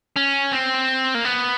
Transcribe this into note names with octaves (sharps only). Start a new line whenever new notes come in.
C#4
C4
A#3
B3